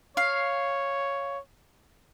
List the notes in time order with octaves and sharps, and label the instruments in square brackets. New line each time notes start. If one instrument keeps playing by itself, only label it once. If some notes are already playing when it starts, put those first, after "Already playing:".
[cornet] C#5 [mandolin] F5